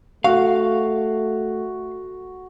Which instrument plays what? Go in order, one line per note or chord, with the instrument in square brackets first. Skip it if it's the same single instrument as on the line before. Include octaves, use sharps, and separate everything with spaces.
[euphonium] A3 [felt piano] F#4 [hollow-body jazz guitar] F5